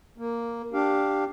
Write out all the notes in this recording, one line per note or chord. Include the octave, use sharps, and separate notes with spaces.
A#3
D4 G4 F5